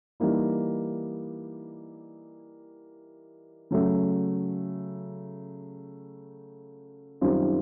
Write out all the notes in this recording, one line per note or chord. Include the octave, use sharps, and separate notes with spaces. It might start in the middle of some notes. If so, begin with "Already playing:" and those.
E3 G3 A#3 D#4
C#3 F#3 A3
F#2 D#3 G3 C4 F4